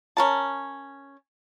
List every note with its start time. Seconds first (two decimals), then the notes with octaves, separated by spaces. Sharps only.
0.17 C#4 A#4 A5